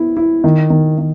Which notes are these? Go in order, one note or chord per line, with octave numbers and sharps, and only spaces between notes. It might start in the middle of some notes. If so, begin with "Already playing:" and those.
Already playing: B3 E4
E4
D#3
D#3
D#3